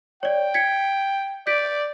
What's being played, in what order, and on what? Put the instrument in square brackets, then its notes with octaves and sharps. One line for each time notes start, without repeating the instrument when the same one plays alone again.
[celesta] C#5 D5 [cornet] G5
[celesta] G#6 B6 C#7
[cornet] D5 [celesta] G6 B6 D7